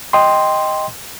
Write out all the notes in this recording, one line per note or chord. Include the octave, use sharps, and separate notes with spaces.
D#5 G5 C6